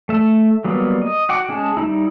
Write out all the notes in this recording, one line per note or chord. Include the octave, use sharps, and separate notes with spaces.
A3 E5
F#3 G3 A#3 B3
D#5
F#4 F#5 G5 D6
G#3 C#4 G#4 A5
G3 C#4 D#4 E4